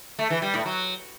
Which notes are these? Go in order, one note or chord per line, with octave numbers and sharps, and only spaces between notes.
A3
E3
G3
A2
F#3